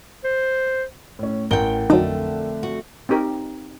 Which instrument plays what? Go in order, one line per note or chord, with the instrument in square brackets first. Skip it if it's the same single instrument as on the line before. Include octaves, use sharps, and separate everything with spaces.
[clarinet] C5
[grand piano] A2 C#4
[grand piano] A1 E3 G7 [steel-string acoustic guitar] A2 [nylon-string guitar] A#4 F#5 G5
[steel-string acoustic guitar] F2 A3 [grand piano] D3 [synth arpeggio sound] F#3 D#4
[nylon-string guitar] F#4
[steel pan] C4 D#4 G4 A#4